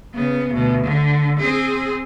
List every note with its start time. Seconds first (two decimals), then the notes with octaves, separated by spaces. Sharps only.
0.14 C#3 B3
0.54 D2 B2
0.84 D3
1.39 C4 G#4